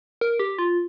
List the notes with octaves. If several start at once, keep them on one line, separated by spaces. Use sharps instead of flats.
A#4
G4
F4